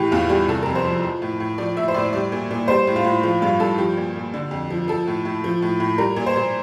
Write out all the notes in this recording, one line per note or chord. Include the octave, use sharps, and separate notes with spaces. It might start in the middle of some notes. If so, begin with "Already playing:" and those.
Already playing: A2 E3 G4
E2 F4
G3 G4
C3 A4
F2 A#4
C5
F3
F3
A2
A2
F3 D5
A2 E5
C5
A2 D5
G3 D5
A#2
A#2
G3 C5
A2
F4
A2
F3 F4
G2 F4
G2 A4
F3 G4
A#2
A#2
D3
F2
F3
F3 A4
A2
A2
F3
A2
A2
G3 A#4
A#2
C5
A#2